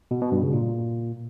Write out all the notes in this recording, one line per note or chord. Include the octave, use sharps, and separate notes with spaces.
B2
B2
G2
C#3
A#2